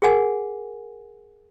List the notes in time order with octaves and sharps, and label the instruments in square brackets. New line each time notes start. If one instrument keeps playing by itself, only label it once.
[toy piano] G#4 A#4 F#5 G#5